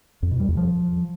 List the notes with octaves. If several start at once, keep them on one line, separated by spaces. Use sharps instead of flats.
F2
B2
G3
E2
F3